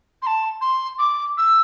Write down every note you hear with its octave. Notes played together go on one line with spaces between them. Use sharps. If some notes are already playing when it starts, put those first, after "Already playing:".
C6
A5
C6
D6
E6